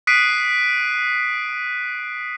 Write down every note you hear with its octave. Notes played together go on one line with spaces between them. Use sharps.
D#6 F#6 B6 C7 D7 D#7